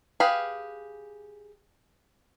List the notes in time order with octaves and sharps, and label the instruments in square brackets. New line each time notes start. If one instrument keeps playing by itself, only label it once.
[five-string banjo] G4 G#4 B4 F5